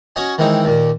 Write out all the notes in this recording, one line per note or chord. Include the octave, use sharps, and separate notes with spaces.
C#4 F#4 C#5 D#5 G#5
D#3 E3 G#3 C4 D#4
D#2 A#2